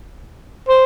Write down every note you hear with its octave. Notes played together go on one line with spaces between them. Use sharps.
C5